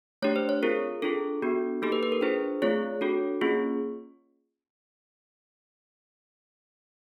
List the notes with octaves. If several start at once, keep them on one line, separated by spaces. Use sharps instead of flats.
A3 D4 G4 C#5
C5
C#5
C4 F4 G#4 A#4
D4 F4 G#4 A4
B3 D4 F#4
A#3 D#4 G4 A4
B4
B4
A#4
D4 F4 G#4 C5
A3 C4 F4 G#4 C#5
D4 F#4 A4
A#3 C#4 F4 G#4